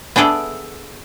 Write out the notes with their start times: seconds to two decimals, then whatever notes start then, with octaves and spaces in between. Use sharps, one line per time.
0.16 B3 D4 G#4 A4 E5